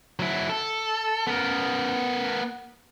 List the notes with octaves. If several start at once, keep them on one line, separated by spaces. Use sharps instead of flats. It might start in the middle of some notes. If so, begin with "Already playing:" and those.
F#3 E4
A4
B3 A#4